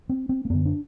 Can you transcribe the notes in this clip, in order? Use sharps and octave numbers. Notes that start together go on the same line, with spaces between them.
C4
C4
A#3
F#2 D3 B3
D4